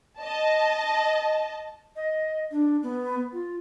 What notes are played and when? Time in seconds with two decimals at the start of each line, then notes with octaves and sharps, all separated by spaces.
0.19 D#5 A5
1.96 D#5
2.52 D4
2.83 B3
3.33 F4